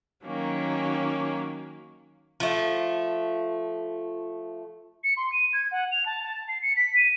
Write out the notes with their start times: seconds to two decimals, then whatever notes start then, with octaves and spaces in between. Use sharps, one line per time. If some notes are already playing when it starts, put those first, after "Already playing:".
0.24 D#3 F#3 A#3 C#4
2.40 F3 A3
5.03 C#7
5.17 C6
5.32 D#7
5.53 G#6
5.71 F#5
5.91 F7
6.06 A5
6.23 A5
6.48 C7
6.62 C#7
6.76 B6
6.96 D#7